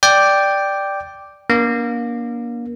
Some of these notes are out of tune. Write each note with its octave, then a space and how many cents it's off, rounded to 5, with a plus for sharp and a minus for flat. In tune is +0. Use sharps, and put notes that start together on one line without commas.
D5 +0 G5 +0
A#3 +25 D4 -30